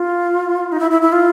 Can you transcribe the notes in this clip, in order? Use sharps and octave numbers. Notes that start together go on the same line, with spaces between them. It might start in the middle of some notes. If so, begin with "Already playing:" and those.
Already playing: F4
D#4
E4
E4
E4
F4